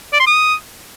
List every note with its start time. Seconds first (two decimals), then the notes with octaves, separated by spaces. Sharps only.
0.13 D5
0.20 C6
0.27 D#6